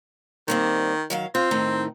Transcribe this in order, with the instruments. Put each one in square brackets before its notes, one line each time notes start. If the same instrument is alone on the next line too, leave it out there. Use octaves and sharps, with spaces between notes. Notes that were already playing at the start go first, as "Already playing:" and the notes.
[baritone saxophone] D#3 [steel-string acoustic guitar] G3 A#3 C4
[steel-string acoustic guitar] D#3 F#3 F5
[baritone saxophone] C4 [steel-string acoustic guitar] F4
[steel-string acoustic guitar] A2 D#3 D#4